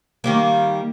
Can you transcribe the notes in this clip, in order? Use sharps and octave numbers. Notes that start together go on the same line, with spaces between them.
D#3 G3 A#3